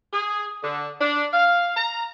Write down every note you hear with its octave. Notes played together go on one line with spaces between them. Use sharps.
G#4
D3
D4
F5
A#5